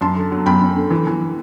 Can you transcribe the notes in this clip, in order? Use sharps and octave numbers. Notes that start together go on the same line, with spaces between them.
F#2 A5 C6
D3
F#3
F#2 G5 B5
F#2
D3
E3
E3